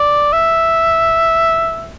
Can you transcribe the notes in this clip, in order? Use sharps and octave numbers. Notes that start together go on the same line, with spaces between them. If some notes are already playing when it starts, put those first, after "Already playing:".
Already playing: D5
E5